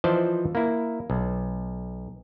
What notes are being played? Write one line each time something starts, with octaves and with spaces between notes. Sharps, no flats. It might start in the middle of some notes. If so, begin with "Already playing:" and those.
E3 F3 C5 D5 D#5 A5
A#3 E4
B1